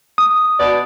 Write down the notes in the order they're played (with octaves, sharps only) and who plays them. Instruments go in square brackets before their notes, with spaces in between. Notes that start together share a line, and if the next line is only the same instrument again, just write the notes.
[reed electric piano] D#6
[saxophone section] B2 D5